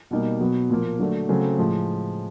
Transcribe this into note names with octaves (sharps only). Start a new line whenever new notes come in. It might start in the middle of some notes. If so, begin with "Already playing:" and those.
B2 G3 A#3 D#4
B2 F#3 B3
A#2 F3 A#3
D3 F#3 A3 D4
C#3 F#3 A3 C4
A2 F3 G#3